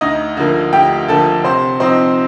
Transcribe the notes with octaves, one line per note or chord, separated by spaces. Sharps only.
D2 D#4 D#5
D3 F3 A#3
D2 G4 G5
D3 F3 A#3 A4 A5
C3 C5 C6
F3 C4 D#4 C5 C6